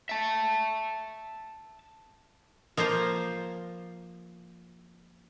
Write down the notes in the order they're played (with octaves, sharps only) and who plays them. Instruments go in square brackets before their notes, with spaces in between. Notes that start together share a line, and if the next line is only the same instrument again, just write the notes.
[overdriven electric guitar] E5 A5
[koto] F3 A#3 F4 C5